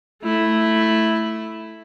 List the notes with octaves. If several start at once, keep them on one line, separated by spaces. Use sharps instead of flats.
A3 E4